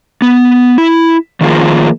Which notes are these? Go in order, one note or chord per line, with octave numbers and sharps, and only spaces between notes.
B3
E4
D#3 F3 A#3 F4 G#4